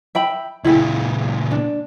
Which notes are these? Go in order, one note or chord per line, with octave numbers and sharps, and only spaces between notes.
E5 G5 B5
C#2 A#2 E4 G#4 G5
D4